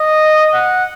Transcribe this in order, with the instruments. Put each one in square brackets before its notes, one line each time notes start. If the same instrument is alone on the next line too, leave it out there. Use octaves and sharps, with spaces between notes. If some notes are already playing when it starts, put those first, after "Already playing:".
Already playing: [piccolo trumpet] D#5
F#5